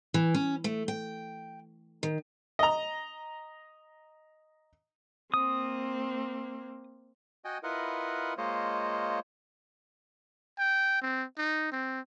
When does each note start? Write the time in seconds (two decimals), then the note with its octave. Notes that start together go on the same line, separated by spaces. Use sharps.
0.14 E3
0.35 C#4
0.64 A3
0.88 G5
2.03 D#3
2.59 D#5 A#5
5.34 A#3 C4 D#6
7.45 F#4 D#5 G5 G#5
7.63 E4 F4 A#4 B4 D#5 F#5
8.38 G#3 A#3 F4 C5 C#5 D#5
10.59 G5
11.02 C4
11.38 D#4
11.72 C4